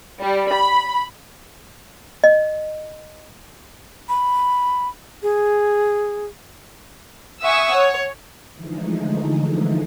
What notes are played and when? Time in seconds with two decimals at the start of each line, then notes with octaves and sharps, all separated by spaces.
0.21 G3
0.51 B5
2.24 D#5
4.09 B5
5.23 G#4
7.42 E5 F#5 G#5 C#6 D#6 E6
7.73 C#5
8.54 D3 E3 F3 G#3 A3 D#4